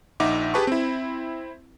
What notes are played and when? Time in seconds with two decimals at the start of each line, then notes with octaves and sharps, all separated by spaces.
0.20 A#1 D#4 E5 F#5 D6
0.54 G4 G#4 B4 A5 C#6
0.67 C4 E4